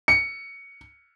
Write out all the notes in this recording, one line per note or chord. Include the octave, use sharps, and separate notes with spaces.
C#7